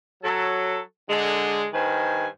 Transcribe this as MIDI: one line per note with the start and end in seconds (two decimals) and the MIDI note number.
0.23 0.79 54
0.23 0.79 69
1.09 1.68 50
1.09 1.68 56
1.73 2.27 43
1.73 2.27 51
1.73 2.27 71
1.73 2.27 72
1.73 2.27 80